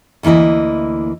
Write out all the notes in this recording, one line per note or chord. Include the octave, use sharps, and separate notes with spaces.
D2 E3 A#3 E4 D#5